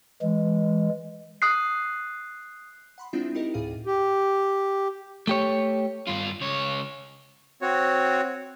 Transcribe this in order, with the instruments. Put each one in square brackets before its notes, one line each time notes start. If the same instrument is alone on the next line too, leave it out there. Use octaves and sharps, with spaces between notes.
[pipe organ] E3 G#3
[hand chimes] D#6 F#6 C7
[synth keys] F#5 B5 C6
G#3 C4 D4 E4 F4 E5
D#4 E4 G4 A#4 D#5
D2 A2 G#4 F5 D#7
[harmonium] G4
[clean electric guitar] A3 G4 C#5
[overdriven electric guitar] G2 F4
C#2 C#5
[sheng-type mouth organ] C4 F#4 C#5